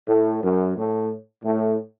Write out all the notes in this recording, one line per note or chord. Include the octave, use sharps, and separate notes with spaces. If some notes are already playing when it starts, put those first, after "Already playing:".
A2
F#2
A2
A2